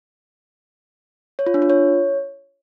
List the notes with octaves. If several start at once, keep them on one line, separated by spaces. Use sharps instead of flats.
C#5
F4
D4
F4
C#5